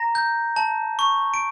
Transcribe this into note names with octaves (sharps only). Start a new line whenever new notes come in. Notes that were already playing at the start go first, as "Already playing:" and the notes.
Already playing: A#5 A#6
G6
A5
C#6
D7